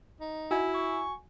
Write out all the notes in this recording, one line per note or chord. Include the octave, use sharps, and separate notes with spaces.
D#4
E4 F#4 G#5
C#6